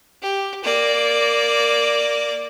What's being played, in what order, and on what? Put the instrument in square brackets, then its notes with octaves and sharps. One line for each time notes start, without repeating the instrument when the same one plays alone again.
[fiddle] G4
A#3 D5